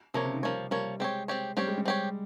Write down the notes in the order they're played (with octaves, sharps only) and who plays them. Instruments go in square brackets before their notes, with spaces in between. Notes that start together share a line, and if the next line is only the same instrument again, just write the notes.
[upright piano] C3 [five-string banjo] F3 A#3 C#5
[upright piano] C#3
D#3
[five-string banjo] F3 A#3 C#5 [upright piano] G3
[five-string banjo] F3 A#3 C#5 [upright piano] G3
[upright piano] G#3 [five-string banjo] C4 G4 C#5
[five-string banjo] C4 G4 C#5
[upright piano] G3 [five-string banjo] C4 G4 C#5
[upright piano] G#3
G3
[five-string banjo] C4 G4 C#5